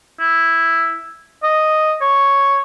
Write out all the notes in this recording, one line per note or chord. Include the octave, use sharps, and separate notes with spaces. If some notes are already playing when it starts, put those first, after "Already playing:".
E4
D#5
C#5